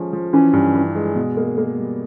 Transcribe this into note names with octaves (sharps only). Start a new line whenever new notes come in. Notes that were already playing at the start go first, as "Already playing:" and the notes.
Already playing: F3 G#3 C#4
F3
E3 C#4
G2
E3
G#3
B2
A#3
A#3
G3